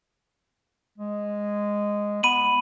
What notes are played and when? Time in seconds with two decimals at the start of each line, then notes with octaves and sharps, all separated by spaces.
0.98 G#3
2.23 B3 B5 D#7 F#7